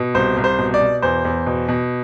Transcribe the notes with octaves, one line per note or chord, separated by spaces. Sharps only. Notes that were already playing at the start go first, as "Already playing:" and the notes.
Already playing: B2
C2 C5
C2
C5
B2
D5
B2
E2 C5
E2
B2
B2